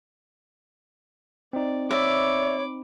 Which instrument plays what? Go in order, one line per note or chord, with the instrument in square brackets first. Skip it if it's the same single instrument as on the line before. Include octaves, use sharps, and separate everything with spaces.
[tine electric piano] C4 D#4 [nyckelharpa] D5
[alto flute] C#5 [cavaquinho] D5 E5 [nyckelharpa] B5 D6